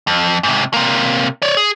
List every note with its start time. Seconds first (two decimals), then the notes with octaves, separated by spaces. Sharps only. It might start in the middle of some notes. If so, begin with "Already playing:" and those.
0.07 F2
0.43 G#2 C3
0.73 C3 A#3
1.42 C#5 D5
1.57 G#4